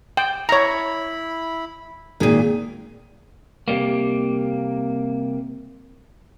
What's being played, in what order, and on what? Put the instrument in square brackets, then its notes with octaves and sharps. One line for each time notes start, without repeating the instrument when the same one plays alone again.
[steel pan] G5
[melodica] E4 B5 [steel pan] C#5 A#5
[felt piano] G#1 G#4 D#7 [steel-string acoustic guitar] A#2 D#3
[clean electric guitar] C3 G3 A#3